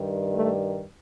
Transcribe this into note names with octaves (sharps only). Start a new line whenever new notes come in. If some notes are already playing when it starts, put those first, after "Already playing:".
Already playing: G2 D#3 G3
A3